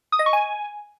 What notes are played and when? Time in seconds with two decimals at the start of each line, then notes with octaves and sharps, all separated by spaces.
0.12 D#6
0.19 D#5
0.26 C#6
0.33 G#5